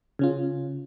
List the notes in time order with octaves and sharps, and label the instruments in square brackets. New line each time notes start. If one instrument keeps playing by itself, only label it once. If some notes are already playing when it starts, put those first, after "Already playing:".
[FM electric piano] C#3 C#4 F4